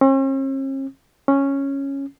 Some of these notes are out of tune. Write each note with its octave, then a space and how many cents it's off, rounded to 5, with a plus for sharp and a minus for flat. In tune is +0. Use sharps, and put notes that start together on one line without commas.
C#4 -45
C#4 -5